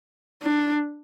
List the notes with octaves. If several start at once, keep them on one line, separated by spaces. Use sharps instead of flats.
D4